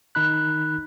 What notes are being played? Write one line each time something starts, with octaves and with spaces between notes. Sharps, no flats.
D#3 D#4 B5 F#6